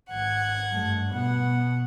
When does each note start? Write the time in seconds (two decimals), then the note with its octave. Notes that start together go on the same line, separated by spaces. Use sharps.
0.11 G#1 F#5 G#6
0.72 G2 A3
1.12 B2 B3 F#5